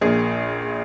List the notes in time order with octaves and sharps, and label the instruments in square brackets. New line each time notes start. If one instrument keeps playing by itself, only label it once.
[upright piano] A#1 A#2 G#4